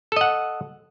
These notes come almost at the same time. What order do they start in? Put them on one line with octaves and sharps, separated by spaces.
A4 D#5 F#5